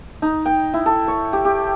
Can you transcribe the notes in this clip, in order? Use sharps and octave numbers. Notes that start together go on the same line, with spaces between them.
D#4
G5
E4
A4
C#5
G4
G4